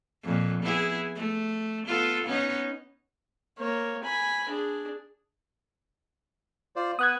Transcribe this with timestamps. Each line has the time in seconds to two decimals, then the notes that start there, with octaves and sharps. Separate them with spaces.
0.23 F2 A#2
0.62 B3 E4 G#4
1.15 A3
1.86 B3 F4 A4
2.25 B3 C#4 D#4
3.58 A#3 C#5
4.04 G#5 B5
4.49 D4 G#4
6.76 F4 C5 D5
6.99 B3 D#6 F#6 G#6